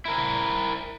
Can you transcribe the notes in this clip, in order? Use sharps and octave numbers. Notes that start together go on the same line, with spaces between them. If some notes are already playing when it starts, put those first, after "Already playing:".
E4 A#4